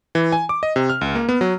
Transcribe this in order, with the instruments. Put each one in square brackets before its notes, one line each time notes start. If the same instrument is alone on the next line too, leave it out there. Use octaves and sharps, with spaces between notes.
[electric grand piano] E3
G#5
D6
D#5
C3
F6
C#2
A#3
B3
F#3